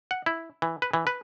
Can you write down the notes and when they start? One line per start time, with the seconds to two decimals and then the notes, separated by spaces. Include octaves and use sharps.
0.11 F#5
0.26 E4
0.62 E3
0.82 B4
0.93 E3
1.07 B4